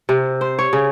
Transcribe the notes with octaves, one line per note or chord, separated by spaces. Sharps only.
C3
C5
C#5
C#3